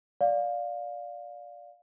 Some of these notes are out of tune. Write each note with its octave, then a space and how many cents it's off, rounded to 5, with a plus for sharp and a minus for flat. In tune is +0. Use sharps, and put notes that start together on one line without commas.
D5 -5 F5 +15